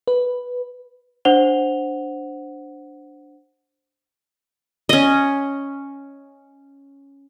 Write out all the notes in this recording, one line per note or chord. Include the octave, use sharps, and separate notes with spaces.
B4
D4 C5 F#5 F7 G7
C#4 D#5